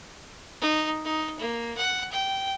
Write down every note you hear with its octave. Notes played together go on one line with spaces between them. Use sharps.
D#4
D#4
A#3
F#5
G5